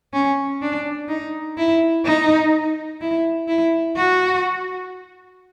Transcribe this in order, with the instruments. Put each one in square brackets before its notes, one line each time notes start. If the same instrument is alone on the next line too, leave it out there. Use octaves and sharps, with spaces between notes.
[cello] C#4
D4
D#4
E4
D#4
E4
E4
F#4